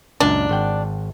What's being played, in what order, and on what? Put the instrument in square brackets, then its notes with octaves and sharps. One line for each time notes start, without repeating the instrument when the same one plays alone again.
[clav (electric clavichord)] C#2 F#2 A#2 [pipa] D4
[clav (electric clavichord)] G#1 F#5 G5